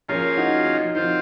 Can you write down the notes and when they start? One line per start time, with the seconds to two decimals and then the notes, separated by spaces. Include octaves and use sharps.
0.09 F3 A#3 C#4 F4 G#4 A#4 C#5
0.37 D#4 F#4
0.66 D#4
0.95 F3 C4 D#4 F4 C5